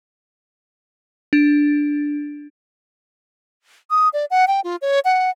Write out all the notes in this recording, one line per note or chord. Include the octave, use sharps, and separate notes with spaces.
D4
D#6
D5
F#5
G5
F4
C#5
F#5